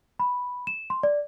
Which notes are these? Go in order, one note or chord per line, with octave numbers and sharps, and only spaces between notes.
B5
E7
C6
D5